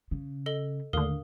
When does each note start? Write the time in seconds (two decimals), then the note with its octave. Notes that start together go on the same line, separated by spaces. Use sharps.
0.11 C#3
0.46 A4 D#5 G7
0.93 D#2 A2 D3 A#4 F5 D#6